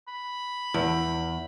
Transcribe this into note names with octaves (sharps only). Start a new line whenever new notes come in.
B5
E2